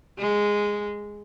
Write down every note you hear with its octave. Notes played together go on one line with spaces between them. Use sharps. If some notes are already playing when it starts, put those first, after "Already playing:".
G#3